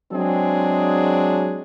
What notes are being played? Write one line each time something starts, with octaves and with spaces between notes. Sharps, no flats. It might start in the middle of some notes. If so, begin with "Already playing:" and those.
F#3 G#3 C4 D4 G#4